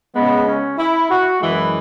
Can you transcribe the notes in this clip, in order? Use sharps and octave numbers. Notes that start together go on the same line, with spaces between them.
C#3 G#3 B3
C#4
E4
F#4
F#2 E3 G#3 E4